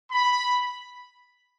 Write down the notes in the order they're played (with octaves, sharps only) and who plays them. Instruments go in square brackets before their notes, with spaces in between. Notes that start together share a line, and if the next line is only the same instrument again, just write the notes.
[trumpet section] B5